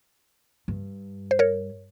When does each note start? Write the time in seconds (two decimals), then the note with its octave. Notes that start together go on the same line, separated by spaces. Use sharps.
0.68 G2
1.31 C5
1.39 A#4 C#5